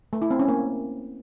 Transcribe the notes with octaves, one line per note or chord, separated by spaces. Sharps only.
A3
E4
C4
C#4
A#3